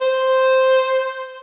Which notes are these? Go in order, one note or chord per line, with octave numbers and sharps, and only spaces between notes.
C5